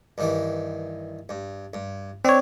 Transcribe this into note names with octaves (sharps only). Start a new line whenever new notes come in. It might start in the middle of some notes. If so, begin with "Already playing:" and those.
G2 D#3 E3
G2
G2
C4 D4 C#5 D5